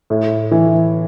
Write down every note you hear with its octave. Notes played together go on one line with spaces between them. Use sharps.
A2
E3